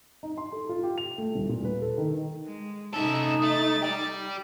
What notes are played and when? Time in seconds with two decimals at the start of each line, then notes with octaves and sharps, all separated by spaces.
0.23 D#4
0.37 C6
0.52 A4
0.69 F4
0.83 G4
0.98 F7
1.18 A3
1.35 D#1
1.49 A#2
1.65 B4
1.82 A4
1.98 D#3
2.45 G#3
2.93 C3 C#4 D#4 G#4 A4 E5
3.43 A3 A6
3.82 G4 D5